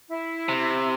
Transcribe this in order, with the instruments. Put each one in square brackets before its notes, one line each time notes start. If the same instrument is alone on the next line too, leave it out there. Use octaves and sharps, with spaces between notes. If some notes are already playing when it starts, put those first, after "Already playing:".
[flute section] E4
[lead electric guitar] C3